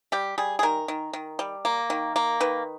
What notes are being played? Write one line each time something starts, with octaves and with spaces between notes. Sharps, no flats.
G3 G4
G3 G#4
G#4
D#3 A#4
D#3
D#3
G3
A#3
D#3
A#3
D#3 B4